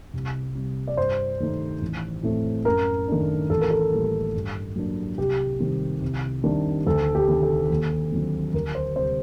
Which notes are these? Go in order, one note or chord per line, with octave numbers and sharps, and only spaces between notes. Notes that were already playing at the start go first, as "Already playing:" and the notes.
C2
C3 G3
D5
G2 C5
D#3 A3 D#4
A1
A2 A3 C4
F#2 A#4
D#3 A3 D4
A1 A4
A#4
A4
A2 G3 A#3
G2
F#3 A#3 D4
C2 G4
C3 D#3 G3 C4
C2
C3 D#3 G3 D4
D2 A4
G4
C3 D#3
A4
D#2
D3 F#3 C4
D2 A#4
C5
C3 G3 C5